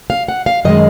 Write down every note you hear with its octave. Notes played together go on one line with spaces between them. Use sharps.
F5
F#5
F5
F#2 D#3 G#3 D#5